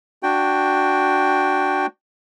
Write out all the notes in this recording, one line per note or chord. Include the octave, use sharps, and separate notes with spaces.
D4 F#4 G5